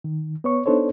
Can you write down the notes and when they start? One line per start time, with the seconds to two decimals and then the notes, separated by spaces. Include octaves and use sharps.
0.04 D#3
0.44 B3 C#5 C#6
0.66 B3 D4 D#4 A4 C5 C#5